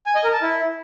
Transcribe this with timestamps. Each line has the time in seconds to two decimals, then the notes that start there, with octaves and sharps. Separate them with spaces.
0.06 G#5
0.15 D#5
0.24 A#4
0.33 A5
0.42 E4